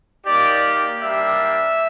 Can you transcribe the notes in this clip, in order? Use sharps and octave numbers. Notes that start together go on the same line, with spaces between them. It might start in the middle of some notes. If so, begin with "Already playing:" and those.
A#3 D#4 G4 D5
G3 A#3 D4 E5